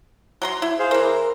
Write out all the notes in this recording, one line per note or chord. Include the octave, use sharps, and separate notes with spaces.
F#3 A#5 C6
E4
G#4 C5 F5
E3 A#4 C5